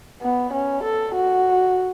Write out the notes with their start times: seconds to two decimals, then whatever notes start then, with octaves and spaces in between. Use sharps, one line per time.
0.22 B3
0.53 C#4
0.84 A4
1.15 F#4